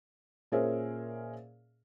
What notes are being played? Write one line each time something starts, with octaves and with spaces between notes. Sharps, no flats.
A#2 C#4 G#4 A#4 C5 E5